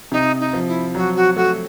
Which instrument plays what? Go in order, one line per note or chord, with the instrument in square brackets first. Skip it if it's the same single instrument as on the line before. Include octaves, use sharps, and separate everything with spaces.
[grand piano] C3 [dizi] D#4
[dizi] D#4
[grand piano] F3
[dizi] E4
[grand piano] F#3 [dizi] F#4
[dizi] F#4
[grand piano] A3 [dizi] F#4